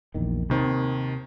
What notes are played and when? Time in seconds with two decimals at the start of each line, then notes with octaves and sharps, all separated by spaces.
0.14 A#1 E2 D#3
0.50 D#2 C3 D#3 C4